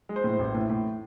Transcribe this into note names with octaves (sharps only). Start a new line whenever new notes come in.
G#3
C5
A2
A1
A2
A2